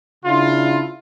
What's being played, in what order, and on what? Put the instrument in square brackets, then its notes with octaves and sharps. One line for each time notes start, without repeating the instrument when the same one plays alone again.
[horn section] C#3 D4 E4 F4